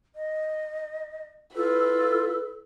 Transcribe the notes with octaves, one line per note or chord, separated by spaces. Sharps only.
D#5
E4 F4 A4 B4 E6